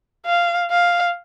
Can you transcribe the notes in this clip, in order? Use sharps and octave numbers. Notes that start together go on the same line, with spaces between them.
F5
F5